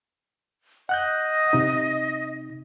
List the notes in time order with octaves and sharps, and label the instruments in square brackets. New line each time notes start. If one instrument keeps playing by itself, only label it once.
[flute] D#5 [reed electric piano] F#5 F#6 G6
[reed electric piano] C3 D#4